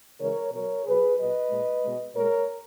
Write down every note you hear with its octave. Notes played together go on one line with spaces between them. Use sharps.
C#3 E3 G#3 A#4 C#5
B2 F#3 A#4 C#5
B2 F#3 G#4 B4
A#2 F#3 B4 D#5
A#2 G#3
B2 G#3
A#2 G#3 A#4 C#5